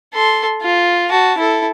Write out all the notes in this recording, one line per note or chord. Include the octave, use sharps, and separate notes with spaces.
A4 C6
F4
F#4 A5
E4 A4